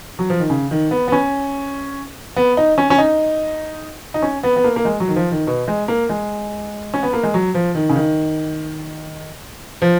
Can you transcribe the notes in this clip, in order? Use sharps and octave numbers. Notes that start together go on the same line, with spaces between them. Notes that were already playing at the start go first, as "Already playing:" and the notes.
F#3
F3
D#3
C#3
D#3
B3
B3
C#4
B3
D#4
C#4
C#4
D#4
D#4
C#4
B3
B3
A#3
A#3
G#3
F#3
D#3
F3
D#3
B2
G#3
A#3
G#3
C#4
B3
A#3
G#3
F#3
F3
D#3
C#3
D#3
F3